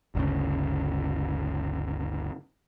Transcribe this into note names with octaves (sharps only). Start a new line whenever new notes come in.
G1 D2 C#3